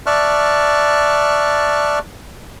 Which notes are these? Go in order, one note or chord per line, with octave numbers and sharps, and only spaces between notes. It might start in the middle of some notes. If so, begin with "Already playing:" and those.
D5 E5 A5 C#6 F6 F#6